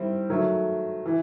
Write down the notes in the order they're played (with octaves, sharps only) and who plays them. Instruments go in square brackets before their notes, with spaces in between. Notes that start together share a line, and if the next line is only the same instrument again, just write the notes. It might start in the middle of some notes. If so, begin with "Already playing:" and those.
Already playing: [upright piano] D#3 G3 C4 E4
D#3 F#3 A3
E3